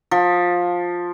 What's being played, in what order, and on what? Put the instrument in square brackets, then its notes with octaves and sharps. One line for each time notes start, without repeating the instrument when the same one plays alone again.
[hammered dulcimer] F3